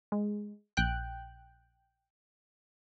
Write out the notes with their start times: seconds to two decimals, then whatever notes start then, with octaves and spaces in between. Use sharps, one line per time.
0.12 G#3
0.77 A#1 G5 F#6